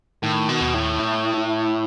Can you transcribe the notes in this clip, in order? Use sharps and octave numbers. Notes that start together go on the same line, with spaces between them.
A2 D#3
B2
D#2
A2
E4
E4